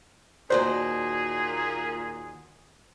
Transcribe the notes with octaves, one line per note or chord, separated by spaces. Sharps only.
D#2 A#2 F#4 G#4 C5 D5